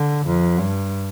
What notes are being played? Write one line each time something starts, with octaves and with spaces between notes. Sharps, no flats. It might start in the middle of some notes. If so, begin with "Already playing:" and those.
Already playing: D3
F2
G2